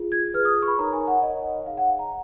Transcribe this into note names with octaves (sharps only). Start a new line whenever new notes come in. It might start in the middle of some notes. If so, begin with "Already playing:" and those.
Already playing: F4 G#4
G#6
F4 G#4 B4 F6
D#6
C#6
B5
D#4 A#4 C#5 A#5
G#5
F#5
D#4 A#4 C#5 D#5
D#4 G#4 C#5 F5
F#5
G#5
A#5